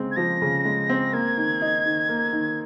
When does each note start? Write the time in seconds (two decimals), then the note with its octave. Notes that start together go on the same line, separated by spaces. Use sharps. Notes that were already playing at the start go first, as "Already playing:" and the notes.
Already playing: C#3 G#3 C4
0.11 G#6
0.16 F3 A#6
0.42 C#3
0.65 G#3
0.89 C4
1.13 A#3 G#6
1.37 D#3
1.62 D#4
1.86 D#3
2.09 A#3
2.33 D#3